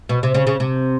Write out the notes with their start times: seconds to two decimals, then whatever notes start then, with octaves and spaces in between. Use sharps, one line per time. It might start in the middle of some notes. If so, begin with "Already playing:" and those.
0.09 B2
0.23 C3
0.34 C#3
0.47 C#3
0.60 C3